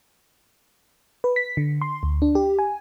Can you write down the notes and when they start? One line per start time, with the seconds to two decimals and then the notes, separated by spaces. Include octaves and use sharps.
1.24 B4
1.36 B6
1.57 D3
1.81 C6
2.03 D2
2.22 D4
2.35 G4
2.59 G#5